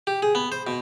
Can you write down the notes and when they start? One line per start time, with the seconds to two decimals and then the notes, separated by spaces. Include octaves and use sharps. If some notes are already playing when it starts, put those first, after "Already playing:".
0.07 G4
0.22 G#4
0.35 B3
0.52 C5
0.67 B2